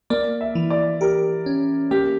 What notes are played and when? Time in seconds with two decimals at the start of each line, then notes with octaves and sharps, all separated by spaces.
0.10 A#3 D5
0.41 E5
0.55 E3
0.70 D5
1.01 G4 A#4
1.46 C#4
1.91 A#3 G4